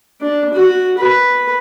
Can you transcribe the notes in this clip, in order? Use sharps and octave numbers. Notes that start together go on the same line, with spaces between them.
D4
F#4
B4